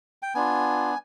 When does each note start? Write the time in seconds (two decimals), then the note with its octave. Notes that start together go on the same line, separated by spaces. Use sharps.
0.22 G5
0.35 B3 D4 F4 G#5